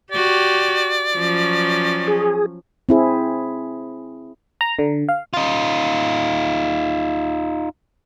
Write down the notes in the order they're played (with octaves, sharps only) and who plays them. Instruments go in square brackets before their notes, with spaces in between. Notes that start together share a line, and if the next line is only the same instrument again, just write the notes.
[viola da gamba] F#4 G4 [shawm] D5
[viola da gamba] F3 F#3 C#4
[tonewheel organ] G#4
[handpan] C4 E4 G#4
[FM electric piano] A#5
D3
F5
[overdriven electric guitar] D#4 F4